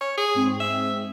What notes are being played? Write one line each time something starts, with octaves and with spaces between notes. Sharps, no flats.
C#5
G#4
G#2 C4
E5